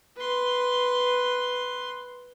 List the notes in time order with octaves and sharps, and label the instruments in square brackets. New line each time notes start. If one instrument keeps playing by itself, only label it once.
[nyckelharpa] B4 C6